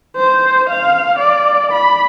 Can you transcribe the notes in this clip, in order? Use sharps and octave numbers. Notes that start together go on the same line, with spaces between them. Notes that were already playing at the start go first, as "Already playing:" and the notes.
C5
F5
D5
B5